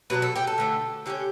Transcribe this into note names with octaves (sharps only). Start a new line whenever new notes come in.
B2 F#3 B3 D4 B4
A4
G4
A4
D3 A3 D4
D3 A3 C#4 G4